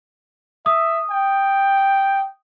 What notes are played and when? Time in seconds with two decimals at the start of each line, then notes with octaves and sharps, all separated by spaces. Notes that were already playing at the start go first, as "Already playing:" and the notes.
0.66 E5 D#6
1.11 G5